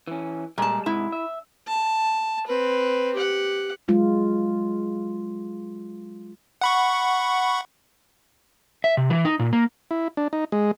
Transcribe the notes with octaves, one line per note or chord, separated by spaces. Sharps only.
E3 C#4
A#2 G3 G#3 A5
G#2 C3 G#3 E4
E5
A5
C4 B4
G4 F#5
F#3 G#3 F4
F#5 B5 C#6
E5
C3
E3
D#4
A#2
A#3
E4
D4
D#4
G#3